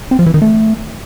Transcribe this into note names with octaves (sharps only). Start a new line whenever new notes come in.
C4
F3
E3
D#3
A3